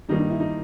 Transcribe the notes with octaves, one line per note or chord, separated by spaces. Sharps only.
G2 D#3 G3 A#3 D#4
D#4
E4
D#4